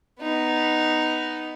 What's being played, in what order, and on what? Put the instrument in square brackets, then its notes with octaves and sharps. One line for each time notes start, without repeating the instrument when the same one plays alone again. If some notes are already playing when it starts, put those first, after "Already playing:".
[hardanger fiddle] B3 D#4